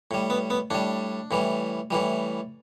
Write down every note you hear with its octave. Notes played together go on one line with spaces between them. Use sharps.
A2 G3
B3
B3
A2 G3 D4
A2 E3 G3
A2 E3 G3